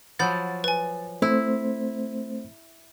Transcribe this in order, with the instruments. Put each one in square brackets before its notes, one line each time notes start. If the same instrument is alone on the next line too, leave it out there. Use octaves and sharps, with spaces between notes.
[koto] F3 F#3 [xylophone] F#5 B5 G6 [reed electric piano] A6
[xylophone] B4 G#5
[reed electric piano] A3 C4 C5 [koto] E4